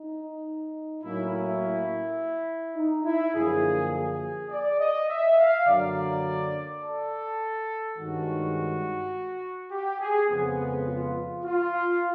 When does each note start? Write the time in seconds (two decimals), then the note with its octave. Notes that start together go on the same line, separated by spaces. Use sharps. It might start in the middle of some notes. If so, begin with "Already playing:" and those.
Already playing: D#4
1.02 A2 F#3 A#3 C#4 E4
1.31 E4
2.76 D#4
3.05 E4
3.34 F#2 D3 F3 A#3 G#4
3.92 G#4
4.50 D5
4.79 D#5
5.08 E5
5.37 F5
5.65 F#2 D3 F#3 A#3 D5
6.81 A4
7.97 G2 D#3 G#3 C#4 F#4
9.71 G4
10.01 G#4
10.29 F2 C#3 F3 G#3 B3
10.87 F4
11.44 F4